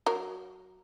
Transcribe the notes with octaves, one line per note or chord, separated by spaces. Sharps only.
F#3 A#4